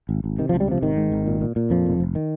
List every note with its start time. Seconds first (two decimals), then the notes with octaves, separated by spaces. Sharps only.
0.09 G#1
0.24 G#1
0.38 C3 D#3
0.49 F3
0.53 C#2
0.60 G3
0.68 C3 F3
0.82 G#1 D#3
0.97 G#2
1.12 G#1
1.27 A#2
1.41 A#2
1.56 A#2
1.70 F2 F3
1.86 F1
2.00 F1
2.15 D#3